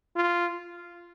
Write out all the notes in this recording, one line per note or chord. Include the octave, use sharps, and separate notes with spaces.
F4